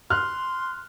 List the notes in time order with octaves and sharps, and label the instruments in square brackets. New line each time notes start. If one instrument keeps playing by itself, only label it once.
[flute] C6 [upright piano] F6 F#6